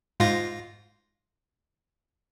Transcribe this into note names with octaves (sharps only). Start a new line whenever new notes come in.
G#2 F4 A#6